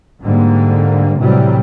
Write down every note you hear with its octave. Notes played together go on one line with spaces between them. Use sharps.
G#2 D3 G3 A#3
A2 C3 E3 F#3 G3